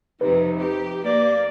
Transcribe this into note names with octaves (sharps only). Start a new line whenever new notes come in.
F2 C3 D#4 B4
G4
A#3 D5